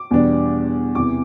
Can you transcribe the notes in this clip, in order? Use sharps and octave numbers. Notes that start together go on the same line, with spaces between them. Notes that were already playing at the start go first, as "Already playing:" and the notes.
Already playing: D6
E2 B2 G3 B3 D4
E2 C3 E3 D6